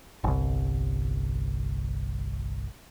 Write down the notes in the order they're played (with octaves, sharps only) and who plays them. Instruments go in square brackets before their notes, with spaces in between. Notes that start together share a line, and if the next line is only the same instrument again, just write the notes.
[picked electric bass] G1 C2